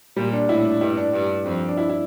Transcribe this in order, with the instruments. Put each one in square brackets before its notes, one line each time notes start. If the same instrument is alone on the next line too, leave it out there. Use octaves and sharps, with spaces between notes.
[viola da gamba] A#2 [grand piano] G3
[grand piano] D4
[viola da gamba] A2 [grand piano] E4
[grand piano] D4
[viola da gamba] G2 [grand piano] E4
[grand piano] D4
[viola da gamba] G2
F2
[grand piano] D4
E4
E4